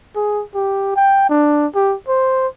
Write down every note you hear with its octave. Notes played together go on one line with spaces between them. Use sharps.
G#4
G4
G5
D4
G4
C5